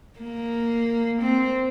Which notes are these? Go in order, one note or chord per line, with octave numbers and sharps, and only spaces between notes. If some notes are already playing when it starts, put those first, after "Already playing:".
A#3
C4